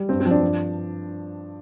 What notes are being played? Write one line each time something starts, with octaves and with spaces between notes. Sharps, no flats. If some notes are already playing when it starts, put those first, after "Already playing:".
Already playing: G3
G2 C4
C4
F3
D4
G2